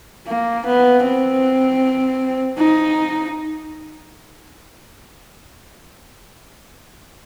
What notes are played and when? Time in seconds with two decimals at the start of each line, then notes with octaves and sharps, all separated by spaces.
0.27 A#3
0.66 B3
1.04 C4
2.58 D#4